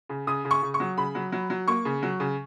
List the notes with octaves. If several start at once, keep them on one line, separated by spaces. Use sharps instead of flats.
C#3
C#3 D#6
C#3
C#6
C#3
C#6
F#3
C#3 B5
F#3
F#3
F#3
A#3 C#6
C#3
F#3
C#3